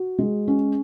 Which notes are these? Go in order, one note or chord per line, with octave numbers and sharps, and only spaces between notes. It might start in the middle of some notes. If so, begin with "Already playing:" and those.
Already playing: F#4
G#3
C#4